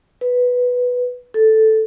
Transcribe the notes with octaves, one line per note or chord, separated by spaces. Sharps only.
B4
A4